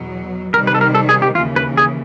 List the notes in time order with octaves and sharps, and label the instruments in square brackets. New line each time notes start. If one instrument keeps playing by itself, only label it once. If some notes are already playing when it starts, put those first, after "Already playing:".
Already playing: [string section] E2 B2 F#3
[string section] C3 D#3 G3 [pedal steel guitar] A#4
[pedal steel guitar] B4
A4
A#4
A4
G#4
G4
[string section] D#2 C#3 E3 [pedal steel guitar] F4
[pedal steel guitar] B4
G#4